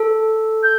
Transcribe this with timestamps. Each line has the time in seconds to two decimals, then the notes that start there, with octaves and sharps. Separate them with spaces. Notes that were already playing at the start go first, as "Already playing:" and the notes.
Already playing: A4
0.63 G6